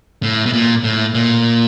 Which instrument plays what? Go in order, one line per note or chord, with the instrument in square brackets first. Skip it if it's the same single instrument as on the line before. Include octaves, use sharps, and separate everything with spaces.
[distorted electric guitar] A2
B2
A#2
A2
A#2